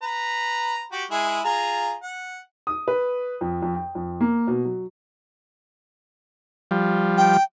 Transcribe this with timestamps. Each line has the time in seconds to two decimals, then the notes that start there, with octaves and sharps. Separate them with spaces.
0.03 B4 A#5
0.92 F#4 G4
1.11 G#3 E4 G#4
1.45 F4 G#4 A#5
2.03 F#5
2.67 D#6
2.88 B4
3.41 F2
3.62 F2
3.75 G5
3.95 F2
4.21 A#3
4.47 B2
4.65 F#3
6.71 F3 G3
7.17 G5